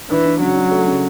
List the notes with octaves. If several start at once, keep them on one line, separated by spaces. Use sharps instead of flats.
E3 D4
D4
C#3 F#3
D4
A3
C#3